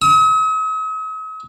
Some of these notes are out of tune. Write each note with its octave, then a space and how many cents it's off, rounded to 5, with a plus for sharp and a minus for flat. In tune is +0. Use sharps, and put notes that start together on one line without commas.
D#6 +45